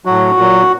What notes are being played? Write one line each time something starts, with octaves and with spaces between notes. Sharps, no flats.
A2 F#3 F#4
A#2 F#3